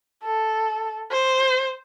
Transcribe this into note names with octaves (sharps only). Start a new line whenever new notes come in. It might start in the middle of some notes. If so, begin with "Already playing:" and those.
A4
C5